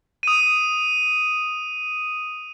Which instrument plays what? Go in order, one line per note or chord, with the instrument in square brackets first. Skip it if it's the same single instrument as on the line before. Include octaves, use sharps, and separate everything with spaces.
[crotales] D#6 D#7